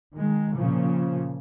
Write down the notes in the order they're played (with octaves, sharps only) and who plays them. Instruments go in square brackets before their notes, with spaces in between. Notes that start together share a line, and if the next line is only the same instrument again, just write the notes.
[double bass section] D#3 G#3
A#2 C#3 F3